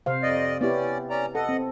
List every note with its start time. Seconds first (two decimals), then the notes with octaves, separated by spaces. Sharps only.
0.06 C3 C5 F5
0.22 F2 D5 D#5
0.61 B3 C#4 E4 G4 D5
1.10 C#4 D5 A#5
1.35 A4 D#5 F#5
1.49 C4